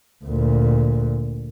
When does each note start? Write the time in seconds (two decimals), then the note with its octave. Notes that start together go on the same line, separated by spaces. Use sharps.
0.25 D2 A#2